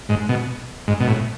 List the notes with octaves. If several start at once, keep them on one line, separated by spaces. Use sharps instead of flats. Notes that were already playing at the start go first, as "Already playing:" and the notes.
G#2
B2
G#2
B2
A2